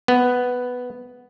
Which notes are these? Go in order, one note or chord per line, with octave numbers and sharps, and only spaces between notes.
B3